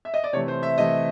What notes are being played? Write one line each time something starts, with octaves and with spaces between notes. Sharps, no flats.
E5
D#5
D5
C3 E3 A3 C#5
C5
E5
C3 E3 A3 D#5